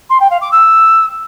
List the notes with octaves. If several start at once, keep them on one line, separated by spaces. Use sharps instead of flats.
C6
G5
F5
D6
E6